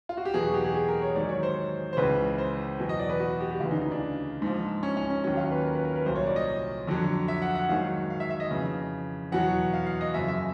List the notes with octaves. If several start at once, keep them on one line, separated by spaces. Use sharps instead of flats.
F4
F#4
G4
E2 B2 F#3 G#4
F#4
G4
G#4
G#4
A#4
C#5
G#2 D#3 F#3 D5
C#5
C5
C5
C#2 C#3 E3 B4
C5
E2 B2 F#3
D#5
D5
B4
F#4
G4
G4
D2 C#3 E3 F4
D#4
D#4
D4
G#2 F3
C#4
C#4
C#4
D#2 D#3 F#3 C#4
F4
B4
A#4
B4
A#4
B4
C2 A#2 F#3 C5
C#5
D5
D#5
F2 D3 F#3
E5
F#5
F#5
G#2 D#3 F#3 F5
F5
E5
E5
D#5
F2 C#3 E3
E2 B2 F#3 F#5
F5
F5
D#5
F#2 C#3 F3 E5
E5